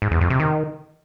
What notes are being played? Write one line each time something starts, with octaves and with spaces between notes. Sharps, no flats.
G#2
E2
F2
C3
D#3